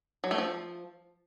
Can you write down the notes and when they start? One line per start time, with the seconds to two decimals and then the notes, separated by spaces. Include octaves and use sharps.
0.24 F#3
0.31 A3
0.38 F3